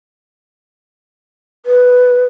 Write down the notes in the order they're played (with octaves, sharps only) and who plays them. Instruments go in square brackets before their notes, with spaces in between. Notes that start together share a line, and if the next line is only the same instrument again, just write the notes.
[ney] B4